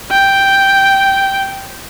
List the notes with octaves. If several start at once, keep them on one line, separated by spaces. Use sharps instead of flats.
G5